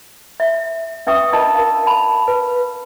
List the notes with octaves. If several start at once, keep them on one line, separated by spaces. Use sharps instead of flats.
E5
C#4 B4 E5 G5 C#6 D#6
D4 F4 A#4 D#5 A5
A#4 F5
F5 A5 B5
B4